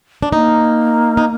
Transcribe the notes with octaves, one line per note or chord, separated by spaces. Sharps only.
D4
A#3 D#4
D#4